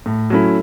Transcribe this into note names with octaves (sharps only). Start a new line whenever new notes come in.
A2
F#3 A3 C#4 E4